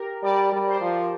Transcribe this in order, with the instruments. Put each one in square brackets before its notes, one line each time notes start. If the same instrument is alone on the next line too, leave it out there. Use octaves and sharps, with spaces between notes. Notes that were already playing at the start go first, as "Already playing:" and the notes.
Already playing: [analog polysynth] G4 A#4
[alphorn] G3 [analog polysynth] D5
[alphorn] G3
[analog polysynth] C5
[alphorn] F3